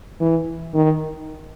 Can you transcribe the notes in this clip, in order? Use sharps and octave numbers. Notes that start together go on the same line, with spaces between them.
E3
D#3